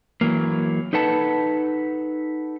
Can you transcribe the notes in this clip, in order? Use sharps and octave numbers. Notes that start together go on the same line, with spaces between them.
E3 F#3 A#3
D#4 A4 B4 F#5 A5